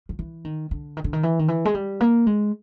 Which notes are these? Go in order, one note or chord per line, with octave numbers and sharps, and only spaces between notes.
F3
E3
D#3
D3
D#3
D3
D#3
E3
D#3
E3
G#3
G3
A#3
G#3